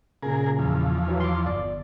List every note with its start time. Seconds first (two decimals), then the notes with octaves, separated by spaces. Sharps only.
0.23 A#2 C#3 G#4 A#4
0.59 E2 F3
1.08 E3 F#3
1.20 C6 D6
1.46 G1 D5